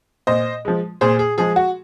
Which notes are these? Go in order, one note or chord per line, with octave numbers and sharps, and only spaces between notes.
A#2 C5 D#5
F3 G#3
A#2 G#4 C5
G#4
F3 G#3 G#4
F#4